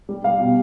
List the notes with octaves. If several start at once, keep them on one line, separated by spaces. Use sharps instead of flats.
G3
G3 F5
B2